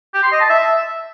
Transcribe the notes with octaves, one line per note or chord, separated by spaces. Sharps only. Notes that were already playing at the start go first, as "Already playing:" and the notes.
G4
C6
D#5
A5
E5